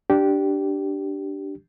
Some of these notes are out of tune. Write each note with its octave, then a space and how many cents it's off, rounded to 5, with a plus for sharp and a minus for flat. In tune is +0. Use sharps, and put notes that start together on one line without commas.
D4 +0 G4 -15